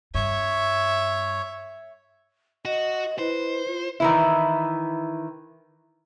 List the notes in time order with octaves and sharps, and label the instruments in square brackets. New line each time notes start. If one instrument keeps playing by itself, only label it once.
[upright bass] G2 [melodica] C#5 [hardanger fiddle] E5
[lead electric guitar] F#4 [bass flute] D#5
[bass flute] E4 [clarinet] B4 [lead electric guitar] C5
[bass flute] F4
[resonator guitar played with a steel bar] D#3 E3 E4